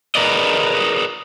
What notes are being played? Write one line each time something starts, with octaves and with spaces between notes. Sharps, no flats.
G#4 A#4 B4 D5 D#5